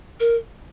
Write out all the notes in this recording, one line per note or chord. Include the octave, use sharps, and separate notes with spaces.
A#4